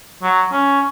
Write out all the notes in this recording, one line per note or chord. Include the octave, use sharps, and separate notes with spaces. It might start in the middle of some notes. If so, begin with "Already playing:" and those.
F#3
C#4